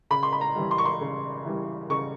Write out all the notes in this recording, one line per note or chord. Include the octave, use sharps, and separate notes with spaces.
C#3 B5
C6
B5
A#5
E3 G3
C6
C#6
C6
C#3
E3 G3
C#3 C#6